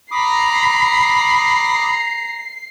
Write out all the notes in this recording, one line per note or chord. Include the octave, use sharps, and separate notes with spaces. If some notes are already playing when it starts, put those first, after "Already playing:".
A#5 B5 D6 D#6 C7